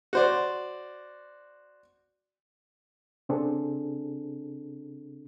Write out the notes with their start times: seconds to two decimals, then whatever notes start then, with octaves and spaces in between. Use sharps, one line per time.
0.13 F#4 C5 D5
3.29 C#3 C4 D4 G#4 A4